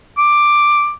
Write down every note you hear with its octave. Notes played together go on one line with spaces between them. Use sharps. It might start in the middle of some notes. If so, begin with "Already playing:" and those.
D6